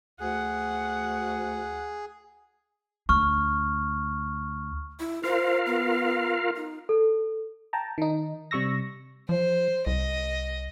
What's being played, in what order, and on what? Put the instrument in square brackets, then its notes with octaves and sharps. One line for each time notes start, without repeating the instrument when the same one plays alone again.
[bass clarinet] D2 [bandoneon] G#4 [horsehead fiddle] F#5
[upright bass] D2 [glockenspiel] C#6 F6
[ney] E4
[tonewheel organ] F4 A#4 F5 [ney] C5
[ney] B3
D#4
[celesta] A4
[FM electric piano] G5 A5 A#5
D#3 D#4
C3 G3 C#6 E6 A#6
[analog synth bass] F3 [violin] C5
[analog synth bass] C2 [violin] D#5